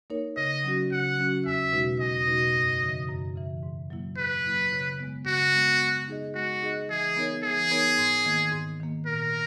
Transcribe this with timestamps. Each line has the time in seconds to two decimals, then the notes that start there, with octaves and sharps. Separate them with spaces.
0.10 A#3 D#4 A#4 C#5
0.37 C#3 D#5
0.64 F#3 C#4 F#4
0.92 C#3 F#5
1.19 F#3 C#4 F#4
1.46 E2 E5
1.72 B2 G#3 D#4 F#4
2.00 E2 D#5
2.27 B2 G#3 D#4 F#4
2.55 F#2
2.81 C#3 E3
3.09 F#2
3.36 C#3 E3
3.63 G#2
3.90 F#3 A#3 E4
4.17 G#2 B4
4.45 F#3 A#3 E4
4.72 C#3
4.99 G#3 B3
5.26 C#3 F#4
5.53 G#3 B3
5.80 G#3
6.08 D#4 G#4 D#5
6.35 G#3 F#4
6.63 D#4 G#4 D#5
6.90 E3 G#4
7.16 B3 D#4 A#4 C#5
7.43 E3 G#4
7.71 B3 D#4 A#4 C#5
7.98 G#2
8.26 D#3 A#3
8.52 G#2
8.80 D#3 A#3
9.06 A#2 A#4